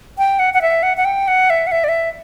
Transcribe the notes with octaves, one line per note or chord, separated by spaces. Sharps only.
G5
F#5
F#5
E5
F#5
F#5
G5
F#5
E5
F#5
E5
D5
E5